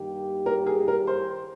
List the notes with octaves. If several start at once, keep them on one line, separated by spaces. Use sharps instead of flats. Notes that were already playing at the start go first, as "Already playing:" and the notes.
Already playing: G2 D#3 A#3 D#4 G4
A#4
G#4
A#4
C5